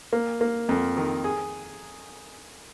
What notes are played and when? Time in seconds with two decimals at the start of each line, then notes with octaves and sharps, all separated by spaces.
0.13 A#3
0.41 A#3
0.69 F2
0.97 D#3
1.24 G#4